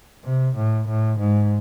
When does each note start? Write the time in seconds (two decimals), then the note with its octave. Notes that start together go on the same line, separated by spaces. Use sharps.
0.24 C3
0.56 A2
0.88 A2
1.19 G#2